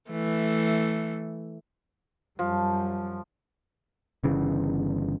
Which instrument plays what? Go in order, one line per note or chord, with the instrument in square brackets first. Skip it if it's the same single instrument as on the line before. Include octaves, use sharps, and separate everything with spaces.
[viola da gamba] E3 A3
[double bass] F#2 G3 [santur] F3
[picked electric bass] G1 C#3 E3